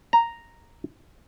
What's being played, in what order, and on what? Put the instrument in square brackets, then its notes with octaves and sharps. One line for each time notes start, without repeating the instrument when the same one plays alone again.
[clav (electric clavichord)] A#5